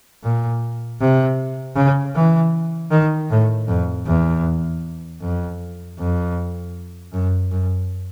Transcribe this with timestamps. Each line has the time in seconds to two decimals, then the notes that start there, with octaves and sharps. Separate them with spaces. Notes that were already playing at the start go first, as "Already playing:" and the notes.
0.23 A#2
1.00 C3
1.76 C#3
2.15 E3
2.91 D#3
3.30 A2
3.68 F2
4.06 E2
5.21 F2
5.98 F2
7.13 F#2
7.51 F#2